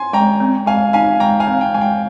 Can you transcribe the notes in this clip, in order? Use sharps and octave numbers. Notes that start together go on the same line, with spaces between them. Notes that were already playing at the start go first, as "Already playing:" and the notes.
Already playing: G#5 C6
G#3 G5 A#5
C4
G#3 F5 G#5
D#4 F5 G#5
G#3 G5 A#5
F5 G#5
C4
G5
G#3 G#5
G5